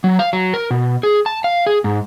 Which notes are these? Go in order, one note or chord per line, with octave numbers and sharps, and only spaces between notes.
F#3
F5
F#3
A#4
B2
G#4
A5
F5
G#4
G#2